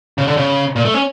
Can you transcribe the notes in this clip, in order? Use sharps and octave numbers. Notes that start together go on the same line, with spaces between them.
C#3
D3
C#3
A#2
A3
C#4